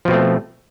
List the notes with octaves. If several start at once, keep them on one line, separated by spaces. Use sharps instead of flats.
B2 F3 A3 C4